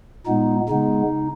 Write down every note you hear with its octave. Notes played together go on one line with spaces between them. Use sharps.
A#2 G#3 B3 D#4
C#3 G#3 B3 D#4